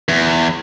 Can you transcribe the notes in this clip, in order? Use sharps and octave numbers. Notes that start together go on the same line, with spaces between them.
E2